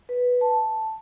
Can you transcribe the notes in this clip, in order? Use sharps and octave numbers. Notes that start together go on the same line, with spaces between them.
B4
A5